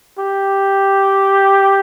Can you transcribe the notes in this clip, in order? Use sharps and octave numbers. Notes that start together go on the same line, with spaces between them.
G4